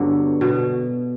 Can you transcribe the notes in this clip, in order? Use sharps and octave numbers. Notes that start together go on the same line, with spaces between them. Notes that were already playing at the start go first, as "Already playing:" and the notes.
Already playing: G2 D3 F#3 B3
B2